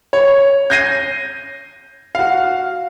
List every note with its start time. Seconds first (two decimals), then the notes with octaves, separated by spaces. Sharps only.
0.13 C#5
0.70 G6 G#6 A#6 C7 D#7
2.15 F#4 F5